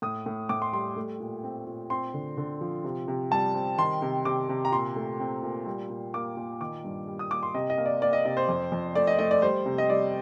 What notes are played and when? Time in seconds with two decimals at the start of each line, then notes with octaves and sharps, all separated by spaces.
0.02 A2 D#6
0.26 A2
0.49 A2 D6
0.62 C6
0.73 G3 C6
0.96 A3
1.20 A#2
1.43 C4
1.67 A#2
1.90 C4 C6
2.14 D3
2.37 D3
2.61 F3
2.84 C3
3.08 C3
3.31 G3 A5
3.55 C4
3.78 D#3 C6
4.02 C3
4.25 C3 D6
4.49 C3
4.65 A#5
4.72 A#2 C6
4.96 A3
5.20 C4
5.43 A#2
5.66 G3
5.90 A#2
6.14 A#3 D6
6.37 A#2
6.61 D#3 D6
6.84 G2
7.08 G3
7.19 D#6
7.31 A#3 D6
7.43 C6
7.54 C3 D#5
7.70 D#5
7.78 A#3
7.86 D5
8.02 A#3 D5
8.13 D#5
8.25 C3 D#5
8.37 C5
8.48 F2
8.72 F2
8.95 A3 D5
9.07 D#5
9.19 A3 D#5
9.31 D5
9.42 G3 C5
9.66 C3
9.78 D#5
9.89 G3 D5